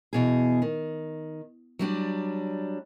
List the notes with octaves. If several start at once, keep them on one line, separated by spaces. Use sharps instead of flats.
E2 B2 G#4
D#3
F#3 G3 D4